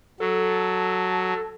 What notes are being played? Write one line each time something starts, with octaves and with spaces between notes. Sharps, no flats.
F#3 A4